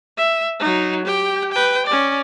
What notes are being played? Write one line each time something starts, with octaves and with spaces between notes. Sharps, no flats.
E5
F#3 D#4
G4 G5
B4 G5
C#4 D5